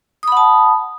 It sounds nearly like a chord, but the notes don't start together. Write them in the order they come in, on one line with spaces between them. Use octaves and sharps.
D#6 B5 F#5 A5